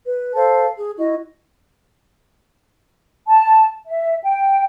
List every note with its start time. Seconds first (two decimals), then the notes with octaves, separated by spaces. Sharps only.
0.07 B4
0.35 A4 C5 F5 A5
0.76 G#4
0.97 E4 F#4 D#5
3.27 A5
3.86 E5
4.24 G5